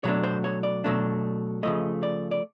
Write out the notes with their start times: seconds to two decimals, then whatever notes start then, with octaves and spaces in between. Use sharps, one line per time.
0.04 B2 F#3 A3 D4 C#5
0.23 C5
0.44 C#5
0.63 D5
0.84 B2 F#3 A3 D4
1.63 C#3 F3 A3 D#5
2.03 D5
2.31 D5